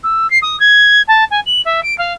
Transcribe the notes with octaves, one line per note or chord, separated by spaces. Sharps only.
E6
C7
D#6
G#6
A5
G#5
F#7
E5
D7
F5